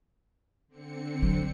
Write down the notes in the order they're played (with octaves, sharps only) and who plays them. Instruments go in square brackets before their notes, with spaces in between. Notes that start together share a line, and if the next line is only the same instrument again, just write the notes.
[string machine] D3 C4 C#7
[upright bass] F#3